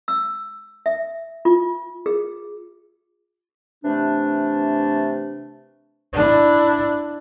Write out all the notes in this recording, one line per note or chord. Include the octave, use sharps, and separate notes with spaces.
E6
E5
F4
G#4
C3 E3 A3 D4
D4 E4